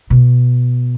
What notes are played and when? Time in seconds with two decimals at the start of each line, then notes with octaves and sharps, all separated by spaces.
0.10 B2